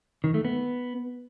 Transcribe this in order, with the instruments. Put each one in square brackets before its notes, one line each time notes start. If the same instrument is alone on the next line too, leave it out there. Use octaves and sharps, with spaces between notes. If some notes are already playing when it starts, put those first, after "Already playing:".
[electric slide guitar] D#3
A3
B3